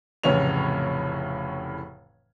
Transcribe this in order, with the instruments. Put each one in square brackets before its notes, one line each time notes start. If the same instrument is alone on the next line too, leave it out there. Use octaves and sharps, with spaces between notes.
[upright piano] F1 A2 C#3 E3 C#5 F7